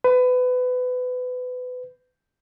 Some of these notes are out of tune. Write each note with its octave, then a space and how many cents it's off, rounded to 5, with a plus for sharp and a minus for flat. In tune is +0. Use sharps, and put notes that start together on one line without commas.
B4 +25